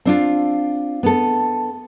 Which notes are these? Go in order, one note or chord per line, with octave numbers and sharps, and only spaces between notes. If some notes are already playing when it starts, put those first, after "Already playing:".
C4 D4 F4
B3 A4